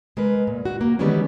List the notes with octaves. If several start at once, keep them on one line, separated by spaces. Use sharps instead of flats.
G#3 A#4 B4
A#2
F#4
A#3
D#3 E3 G3 G#3 B3 C#4